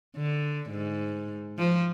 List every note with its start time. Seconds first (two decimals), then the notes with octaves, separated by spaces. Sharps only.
0.16 D3
0.70 G#2
1.58 F3